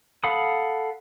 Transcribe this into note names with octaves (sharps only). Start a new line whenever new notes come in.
A4 F5 F#5 B5 D#6